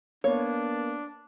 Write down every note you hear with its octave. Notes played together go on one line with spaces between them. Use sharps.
A#3 B3 D4 C#5